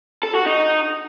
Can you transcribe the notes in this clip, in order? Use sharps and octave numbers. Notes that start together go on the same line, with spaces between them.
A4
F#4
D#4